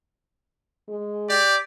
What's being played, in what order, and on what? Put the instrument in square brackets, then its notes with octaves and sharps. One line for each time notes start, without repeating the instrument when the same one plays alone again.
[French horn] G#3
[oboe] G4 [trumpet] D5